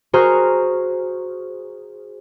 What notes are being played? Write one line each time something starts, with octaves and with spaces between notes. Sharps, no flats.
F#4 G#4 C5 A#5 C#6 F6